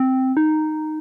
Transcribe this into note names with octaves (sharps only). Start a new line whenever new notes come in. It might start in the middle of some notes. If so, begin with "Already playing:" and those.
Already playing: C4
D#4